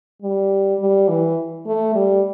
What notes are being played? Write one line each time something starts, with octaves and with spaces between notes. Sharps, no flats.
G3
G3
E3
A3
G3